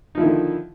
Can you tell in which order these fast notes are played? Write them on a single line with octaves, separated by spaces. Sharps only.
D#4 F3 E4 D#3 D3